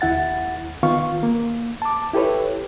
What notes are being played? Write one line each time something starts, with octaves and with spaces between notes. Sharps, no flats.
D#2 E4 F#5 A6
D#3 B3 F4 F5 C#6
A#3
A5 D6
E4 G4 A4 B4 C#5